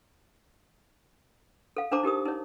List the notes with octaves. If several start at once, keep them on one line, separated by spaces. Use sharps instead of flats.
A4 F5
D4 A4 C5 A5 A#5 D6
D#4 G4 A#4 D#6
D#4 C#5